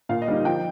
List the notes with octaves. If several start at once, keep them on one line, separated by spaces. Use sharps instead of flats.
A#2 F5
D#5
G3 A#3 D#4
F3 G5